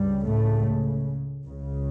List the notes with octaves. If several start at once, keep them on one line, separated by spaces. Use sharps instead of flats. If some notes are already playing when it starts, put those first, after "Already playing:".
Already playing: C#2 G2 C#3 G3
A2 A3
C#2 C#3